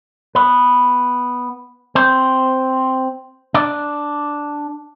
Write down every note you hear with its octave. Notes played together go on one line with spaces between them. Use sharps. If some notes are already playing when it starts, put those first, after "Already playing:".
B3 B4
C4 C5
D4 D5